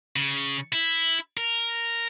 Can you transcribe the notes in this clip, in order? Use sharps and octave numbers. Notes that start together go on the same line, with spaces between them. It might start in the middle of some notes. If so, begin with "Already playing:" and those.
C#3
E4
A#4